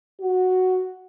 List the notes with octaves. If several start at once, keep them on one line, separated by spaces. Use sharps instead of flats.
F#4